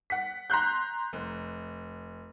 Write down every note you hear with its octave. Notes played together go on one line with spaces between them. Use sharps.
F#5 B6
A#5 C6 F#6 G6
F1